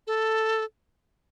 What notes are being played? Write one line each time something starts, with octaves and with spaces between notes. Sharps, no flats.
A4